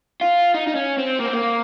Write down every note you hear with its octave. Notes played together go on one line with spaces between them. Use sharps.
F4
D#4
D#4
C#4
C4
A#3
C4
A#3